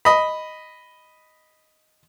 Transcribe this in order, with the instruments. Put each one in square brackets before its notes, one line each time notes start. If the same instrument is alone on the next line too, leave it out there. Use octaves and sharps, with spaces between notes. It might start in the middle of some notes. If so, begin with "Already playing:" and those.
[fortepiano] D#5 B5